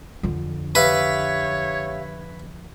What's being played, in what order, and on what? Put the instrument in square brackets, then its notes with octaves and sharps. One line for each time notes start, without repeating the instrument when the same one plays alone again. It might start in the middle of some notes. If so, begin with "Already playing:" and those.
[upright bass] F2 D3
[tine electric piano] G4 E5 F5 [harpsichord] B4 [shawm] C#5